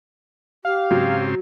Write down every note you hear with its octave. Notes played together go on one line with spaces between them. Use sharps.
G4 F5
G#2 C#3 F#3 C4